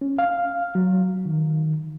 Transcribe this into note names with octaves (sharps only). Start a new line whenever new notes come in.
C#4
F5
F#3
D#3